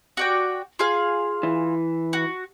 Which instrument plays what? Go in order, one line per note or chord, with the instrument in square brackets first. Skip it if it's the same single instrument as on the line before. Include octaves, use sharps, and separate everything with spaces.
[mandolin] F#4 D5 G5
F4 G#4 F5
[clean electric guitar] E3
[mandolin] F#4